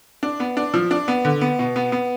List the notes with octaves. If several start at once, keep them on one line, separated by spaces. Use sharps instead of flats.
D4
B3
D4
F3
D4
B3
D3
B3
B2
B3
B3